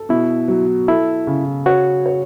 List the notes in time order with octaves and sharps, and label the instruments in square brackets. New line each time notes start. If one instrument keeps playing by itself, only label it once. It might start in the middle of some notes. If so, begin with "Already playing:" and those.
Already playing: [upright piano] A4
[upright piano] B2 [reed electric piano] E4
[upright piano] F#3
[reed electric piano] E4 [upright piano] A4
[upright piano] C#3
[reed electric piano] F#4 [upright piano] C#5
[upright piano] C#5